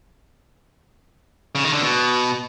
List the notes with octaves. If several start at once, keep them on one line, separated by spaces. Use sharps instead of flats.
C#3
D#3
D3
B2